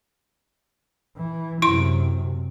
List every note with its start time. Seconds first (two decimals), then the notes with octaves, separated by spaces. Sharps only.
1.17 E3
1.62 F#2 C3 E4 C6